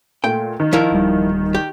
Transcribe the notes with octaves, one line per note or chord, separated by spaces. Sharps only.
A#2 A3 G5
D#3
F3 E4 A#4
D1 G3
G4